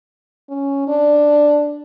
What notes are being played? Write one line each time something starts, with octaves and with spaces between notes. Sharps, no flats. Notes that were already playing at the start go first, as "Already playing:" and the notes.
C#4
D4